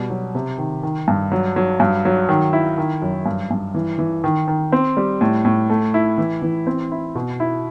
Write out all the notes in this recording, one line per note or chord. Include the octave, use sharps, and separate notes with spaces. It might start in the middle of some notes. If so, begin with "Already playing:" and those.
Already playing: B2 G3
F#3
C3
D#3
D#3
G2
F#3
F#3
G2
F#3
D#3
E4
D#3
F#2
G2
G2
E3
E3
D#3
D#3
C4
G3
A2
A2
A3
E4
E3
E3
C4
E4
B2
E4